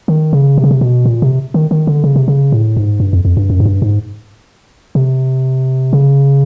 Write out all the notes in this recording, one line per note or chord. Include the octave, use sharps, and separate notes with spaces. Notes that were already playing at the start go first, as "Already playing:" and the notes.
D#3
C#3
C3
C#3
C3
B2
A#2
C3
D#3
D#3
D3
C#3
C3
C#3
A2
G#2
G2
F2
F2
G2
F#2
G#2
G2
G#2
C3
C#3